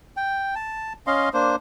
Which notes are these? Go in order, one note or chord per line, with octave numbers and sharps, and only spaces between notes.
G5
A5
C#4 D#5 F5 C6
A#3 D4 C5